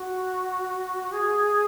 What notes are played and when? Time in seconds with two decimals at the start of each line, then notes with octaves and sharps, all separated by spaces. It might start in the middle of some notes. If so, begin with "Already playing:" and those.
Already playing: F#4
1.12 G#4